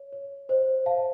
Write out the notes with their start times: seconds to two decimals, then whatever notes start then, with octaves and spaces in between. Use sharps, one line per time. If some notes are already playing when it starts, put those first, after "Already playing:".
Already playing: C#5
0.13 C#5
0.49 C5 D#5
0.86 F5 A5